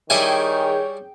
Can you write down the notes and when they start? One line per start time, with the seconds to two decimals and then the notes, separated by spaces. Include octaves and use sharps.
0.10 D#3 G3 E4 G#4 C#5 G5 G#5